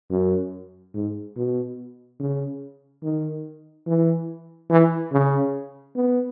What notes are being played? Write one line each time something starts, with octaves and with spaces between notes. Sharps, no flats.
F#2
G#2
B2
C#3
D#3
E3
E3
C#3
B3